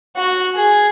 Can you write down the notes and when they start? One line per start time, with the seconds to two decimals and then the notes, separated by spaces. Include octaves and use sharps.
0.16 F#4
0.56 G#4